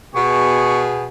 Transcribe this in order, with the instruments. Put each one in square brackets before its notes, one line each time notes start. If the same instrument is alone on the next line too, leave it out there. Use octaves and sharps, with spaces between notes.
[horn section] B2 G#4 [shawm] C#6